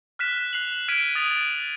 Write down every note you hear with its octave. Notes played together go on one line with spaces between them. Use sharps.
F6 F#6 B6 E7
F#6 C7 F7 F#7
F6 G#6 B6 D7 D#7
D#6 A6 D#7 F7